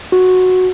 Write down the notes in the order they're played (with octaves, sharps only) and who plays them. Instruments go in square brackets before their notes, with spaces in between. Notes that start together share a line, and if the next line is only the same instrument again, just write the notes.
[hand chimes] F#4